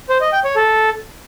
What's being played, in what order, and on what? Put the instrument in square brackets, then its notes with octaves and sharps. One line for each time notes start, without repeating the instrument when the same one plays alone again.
[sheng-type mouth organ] C5
D#5
G5
C#5
A4